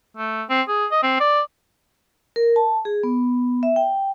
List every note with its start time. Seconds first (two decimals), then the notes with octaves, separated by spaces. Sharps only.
0.17 A3
0.49 C4
0.68 G#4
0.91 D#5
1.03 C4
1.20 D5
2.36 A#4
2.56 A5
2.85 G#4
3.03 B3
3.63 E5
3.76 G5